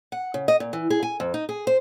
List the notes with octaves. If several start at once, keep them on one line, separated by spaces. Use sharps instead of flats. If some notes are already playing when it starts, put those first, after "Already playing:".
F#5
C#3
D#5
A#2
E3
G#4
G#5
F2
D#4
G#4
C5